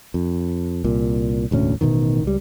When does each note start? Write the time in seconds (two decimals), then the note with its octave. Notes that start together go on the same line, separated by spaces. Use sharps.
0.14 F2
0.84 C2 A#2
1.51 E1 D2 A2 C#4
1.81 A1 B2 D3 D#3
2.24 C#2 G3